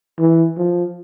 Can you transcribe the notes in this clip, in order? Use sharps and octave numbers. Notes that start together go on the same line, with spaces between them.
E3
F3